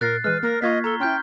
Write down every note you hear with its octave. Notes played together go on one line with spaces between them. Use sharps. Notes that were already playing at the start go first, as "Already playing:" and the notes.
A#2 A#4 F#6 A6 C7
E3 G#3 B4 F6
A#3 A#4
A#3 F4 D#5 F5 C#6 G#6 B6
A4 A#5 G7
C#4 E4 G5 C6 F6 G6